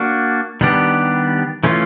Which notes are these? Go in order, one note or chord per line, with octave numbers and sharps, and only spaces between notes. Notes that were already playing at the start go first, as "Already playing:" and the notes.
Already playing: A#3 D4 F#4
D#3 G3 B3 D4 G4
E3 A3 C#4 F4